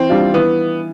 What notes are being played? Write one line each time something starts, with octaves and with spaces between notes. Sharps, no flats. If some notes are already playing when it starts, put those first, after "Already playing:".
Already playing: E3 C4
G3 D4 F4
E3 B3